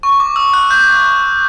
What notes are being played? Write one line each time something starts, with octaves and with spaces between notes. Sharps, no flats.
C#6
D6
E6
F#6
G6